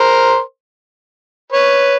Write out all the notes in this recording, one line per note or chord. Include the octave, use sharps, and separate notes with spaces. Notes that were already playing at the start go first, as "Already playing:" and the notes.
Already playing: A#4 C5
B4 C#5